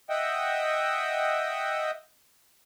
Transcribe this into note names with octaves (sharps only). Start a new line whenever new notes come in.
D#5 E5 F#5 G5